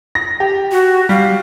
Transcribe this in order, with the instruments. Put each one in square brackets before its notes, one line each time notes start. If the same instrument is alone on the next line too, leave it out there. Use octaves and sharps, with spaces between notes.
[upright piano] A#6
G4
[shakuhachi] F#4
[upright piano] G3 [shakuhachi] F5